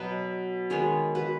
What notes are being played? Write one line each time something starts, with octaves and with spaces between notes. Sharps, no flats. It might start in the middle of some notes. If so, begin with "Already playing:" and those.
Already playing: B2 F#3 B3 B4 D#5
D#3 G#3 B3 G#4 C#5
F#4 B4